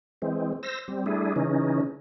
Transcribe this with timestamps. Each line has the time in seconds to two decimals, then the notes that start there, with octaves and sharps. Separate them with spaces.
0.22 E3 G#3 C4
0.63 C5 E6 A#6
0.88 G3 C4
1.06 G3 A3 D4 E4 G#4
1.36 C#3 E3 C#4 D#4